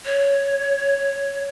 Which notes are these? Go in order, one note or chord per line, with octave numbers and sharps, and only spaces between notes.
C#5